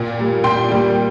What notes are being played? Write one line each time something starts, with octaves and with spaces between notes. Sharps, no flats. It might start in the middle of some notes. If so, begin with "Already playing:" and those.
Already playing: A#2 G5
G3 A#3
A#2 G5 C6
G3 A#3